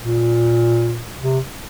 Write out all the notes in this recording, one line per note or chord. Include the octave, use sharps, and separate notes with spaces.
A#2
C3